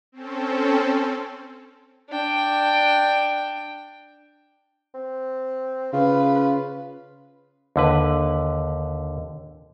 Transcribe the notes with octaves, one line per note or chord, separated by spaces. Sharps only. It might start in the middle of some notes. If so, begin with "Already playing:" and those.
C4 C#4 A4
D4 G5
C4
C#3 F4 B4
D#2 D3 B4